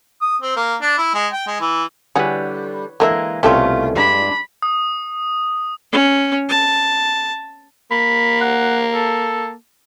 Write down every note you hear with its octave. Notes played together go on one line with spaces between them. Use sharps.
D#6
C4
A#3
D4
E4
G#3
G5
G#3
E3
D3 E3 G3 F#4 G#4 B4 C#5
D3 E3 G#3 A#3 A#4 E5
C2 B2 G3 A3 C#4 F4 A4 E5
G2 G#3 D4 B5
D#6
C#4
A5
A#3 B5
F#5
A4